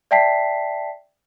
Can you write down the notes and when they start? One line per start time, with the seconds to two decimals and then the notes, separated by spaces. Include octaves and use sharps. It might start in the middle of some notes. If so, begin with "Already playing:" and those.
0.11 D5 E5 G5 A5 B6 C7